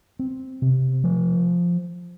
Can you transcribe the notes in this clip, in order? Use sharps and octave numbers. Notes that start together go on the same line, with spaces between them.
C4
C3
F3